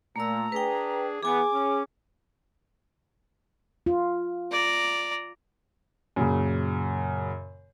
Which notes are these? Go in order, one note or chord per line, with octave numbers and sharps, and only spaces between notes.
A#2 A3 A#5 E6
D4 G#4 B4 G5
E3 B3 G#4 G#5 D6
C#4
F4
D5 A#5
F#2 A#2 C#3